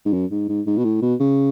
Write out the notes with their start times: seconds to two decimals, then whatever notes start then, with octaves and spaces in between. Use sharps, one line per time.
0.06 G#2
0.13 F#2
0.31 G#2
0.49 G#2
0.67 G#2
0.78 B2
0.85 A2
1.02 B2
1.20 C#3